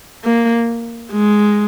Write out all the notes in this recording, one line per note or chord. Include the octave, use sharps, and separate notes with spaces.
A#3
G#3